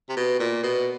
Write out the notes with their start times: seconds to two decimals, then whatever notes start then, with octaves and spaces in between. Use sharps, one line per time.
0.09 C3
0.17 B2
0.40 A#2
0.63 B2